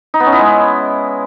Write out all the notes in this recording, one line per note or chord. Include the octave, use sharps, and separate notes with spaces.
D#4
B3
C#4
E4
G#3